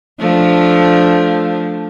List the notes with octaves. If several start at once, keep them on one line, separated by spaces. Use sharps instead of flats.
F3 A3 D4